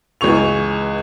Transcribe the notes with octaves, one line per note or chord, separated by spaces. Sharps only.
C#2 E3 G#4 C#6 F7